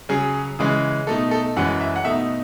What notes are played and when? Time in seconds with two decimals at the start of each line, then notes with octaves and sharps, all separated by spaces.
0.09 C#3 F#3 C#4 G#4
0.59 C#3 E3 G#3 C#4
1.07 B2 A3 D#4 A4
1.31 A4
1.56 F#2 E3 G#3 C#4 F#5
1.81 E5
1.96 F#5
2.05 B2 A3 D#4 E5